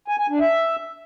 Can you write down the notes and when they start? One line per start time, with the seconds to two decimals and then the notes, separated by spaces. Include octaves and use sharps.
0.08 G#5
0.19 G#5
0.30 D4
0.40 E5